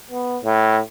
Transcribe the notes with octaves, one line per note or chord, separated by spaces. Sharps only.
B3
A2